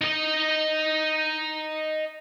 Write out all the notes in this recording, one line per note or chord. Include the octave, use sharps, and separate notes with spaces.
D#4 D#5